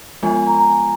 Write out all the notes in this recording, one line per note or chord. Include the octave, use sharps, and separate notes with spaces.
F3 G#3 B3 F4 G#5
G#5
A#5
A#5
G#5